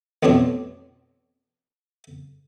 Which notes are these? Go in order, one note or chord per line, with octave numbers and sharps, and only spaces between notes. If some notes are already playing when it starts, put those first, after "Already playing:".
A1 F2 B2 D4 C#5